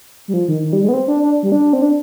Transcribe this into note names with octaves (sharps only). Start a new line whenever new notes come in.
G3
F3
D#3
D#3
G3
G#3
B3
C4
D4
D4
G3
D4
C4
D4